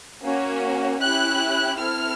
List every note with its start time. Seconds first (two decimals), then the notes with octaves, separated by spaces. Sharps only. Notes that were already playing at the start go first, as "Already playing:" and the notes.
0.23 A#3 C#4 F#4
1.01 C#4 E4 G4 F#6
1.78 C4 E4 A4 F6